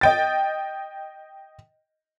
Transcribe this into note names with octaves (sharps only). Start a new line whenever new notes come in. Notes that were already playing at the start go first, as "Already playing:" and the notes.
D#5 G5 A6